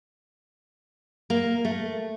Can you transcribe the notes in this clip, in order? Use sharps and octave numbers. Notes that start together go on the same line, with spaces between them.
A#3
A3